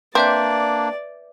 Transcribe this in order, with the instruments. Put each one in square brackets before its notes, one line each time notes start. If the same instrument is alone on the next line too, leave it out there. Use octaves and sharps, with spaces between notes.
[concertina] A#3 D4 [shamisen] C4 [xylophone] B4 E5 G6 [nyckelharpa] D5